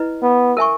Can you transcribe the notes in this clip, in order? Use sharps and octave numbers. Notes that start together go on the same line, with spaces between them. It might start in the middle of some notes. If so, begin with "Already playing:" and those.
Already playing: E4 B4 D#5
B3
A#4 E5 G#5 C#6